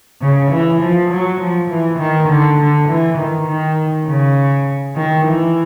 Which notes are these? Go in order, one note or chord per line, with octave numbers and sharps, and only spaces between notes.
C#3
E3
F3
F#3
F3
E3
D#3
D3
D3
E3
D#3
D#3
C#3
D#3
E3